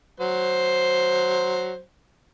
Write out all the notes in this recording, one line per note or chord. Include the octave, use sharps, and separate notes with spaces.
F#3 C5